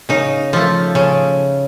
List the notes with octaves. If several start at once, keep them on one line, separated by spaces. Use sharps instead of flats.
C#3 D#4
F3 A3
C#3